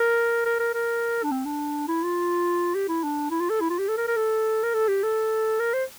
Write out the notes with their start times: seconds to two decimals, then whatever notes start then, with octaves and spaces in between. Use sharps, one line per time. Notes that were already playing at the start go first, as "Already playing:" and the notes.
Already playing: A#4
0.46 A#4
0.60 A#4
0.74 A#4
1.24 D4
1.31 C4
1.45 D4
1.88 E4
2.04 F4
2.75 G4
2.88 E4
3.03 D4
3.31 E4
3.40 F4
3.50 A4
3.61 E4
3.70 F4
3.79 G4
3.89 A4
3.98 A#4
4.08 A#4
4.17 A4
4.64 A#4
4.74 A4
4.88 G4
5.03 A4
5.60 A#4
5.74 C5